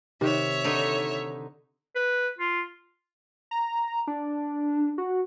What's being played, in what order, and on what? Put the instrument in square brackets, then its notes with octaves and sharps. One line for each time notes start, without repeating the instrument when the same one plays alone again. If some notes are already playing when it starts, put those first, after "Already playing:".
[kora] C3 D#3 [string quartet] C#5 E5
[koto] D3 D#4
[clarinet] B4
F4
[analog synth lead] A#5
D4
F#4